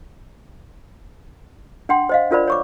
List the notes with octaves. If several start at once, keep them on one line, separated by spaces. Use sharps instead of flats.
D4 F#5 G5 C6
C5 D#5 F5
D4 F4 A#4 C5 D5 B5
C#5 C#6 D6